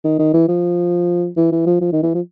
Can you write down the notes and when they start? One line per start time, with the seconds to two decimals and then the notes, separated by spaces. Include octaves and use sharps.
0.04 D#3
0.19 D#3
0.33 E3
0.48 F3
1.36 E3
1.52 E3
1.66 F3
1.81 F3
1.92 D#3
2.03 E3
2.14 F3